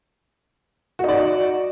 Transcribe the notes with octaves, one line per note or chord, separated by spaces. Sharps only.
D#4 F#4 D5